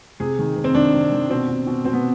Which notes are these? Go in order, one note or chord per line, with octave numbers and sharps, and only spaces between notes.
C3 G#4
D#3
C3
C4
D#3 D4
C3
D#3
B2 C4
B2
B2
B2 C4
B3